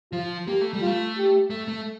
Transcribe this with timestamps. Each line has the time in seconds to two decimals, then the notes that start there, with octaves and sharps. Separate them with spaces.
0.12 F3 F4
0.47 A#3 G4
0.61 A3
0.73 G3
0.81 F4
0.86 A3
1.17 G4
1.50 A3
1.68 A3